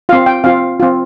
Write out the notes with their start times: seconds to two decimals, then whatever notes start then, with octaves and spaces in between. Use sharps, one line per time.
0.09 C4 F4 F5
0.26 G5
0.44 C4 F4 F5
0.80 C4 F4